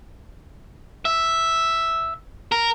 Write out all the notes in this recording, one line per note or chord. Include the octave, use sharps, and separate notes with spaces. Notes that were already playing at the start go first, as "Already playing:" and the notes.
E5
A#4